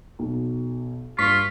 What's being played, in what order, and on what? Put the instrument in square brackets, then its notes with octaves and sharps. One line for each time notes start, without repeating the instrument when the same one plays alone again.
[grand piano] B1
[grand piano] G2 [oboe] F4 [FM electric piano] C#6 B6